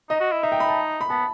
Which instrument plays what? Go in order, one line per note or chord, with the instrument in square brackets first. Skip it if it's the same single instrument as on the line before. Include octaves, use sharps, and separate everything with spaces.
[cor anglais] D#4 [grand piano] D#5
[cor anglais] F#4
E4
[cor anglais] D#4 [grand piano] E5
[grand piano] G5
B5
A5
B5
[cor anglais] B3 [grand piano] A5